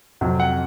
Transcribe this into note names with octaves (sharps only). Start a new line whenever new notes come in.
F2 C3 F#3
F#5